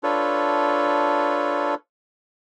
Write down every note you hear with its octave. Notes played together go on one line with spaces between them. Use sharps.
D4 F4 A4 B4 C#5